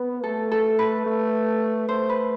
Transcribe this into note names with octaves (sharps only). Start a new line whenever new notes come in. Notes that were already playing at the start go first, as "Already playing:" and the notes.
Already playing: B3 B4
A3 A4
A4
B4
A3
A3 C5
B4